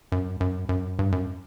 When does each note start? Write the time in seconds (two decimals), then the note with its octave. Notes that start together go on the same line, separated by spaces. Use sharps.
0.12 F#2
0.40 F#2
0.69 F#2
0.99 G2
1.12 F#2